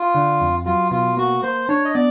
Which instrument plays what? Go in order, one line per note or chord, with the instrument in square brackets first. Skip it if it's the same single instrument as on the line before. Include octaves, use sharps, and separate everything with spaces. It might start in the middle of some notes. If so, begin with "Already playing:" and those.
Already playing: [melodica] F4
[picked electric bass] D3
F2
[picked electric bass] F#3 [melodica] F4
[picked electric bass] B2 [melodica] F4
[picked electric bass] A#3 [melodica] F#4
[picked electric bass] A#3 [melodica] C5
[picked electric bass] D4 [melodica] C#5
[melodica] D#5
[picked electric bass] B3 [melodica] D5